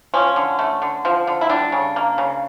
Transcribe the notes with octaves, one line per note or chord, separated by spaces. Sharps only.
F3 C#4
D3
A3
D3
F3
D3
E4
G3 D4
C#3
A#3
C#3